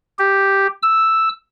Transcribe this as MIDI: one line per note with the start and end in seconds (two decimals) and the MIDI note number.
0.19 0.67 67
0.82 1.29 88